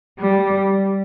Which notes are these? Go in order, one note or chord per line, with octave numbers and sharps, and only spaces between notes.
G3